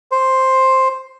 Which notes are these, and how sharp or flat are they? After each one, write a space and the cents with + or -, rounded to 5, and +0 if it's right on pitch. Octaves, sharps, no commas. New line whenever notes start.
C5 +5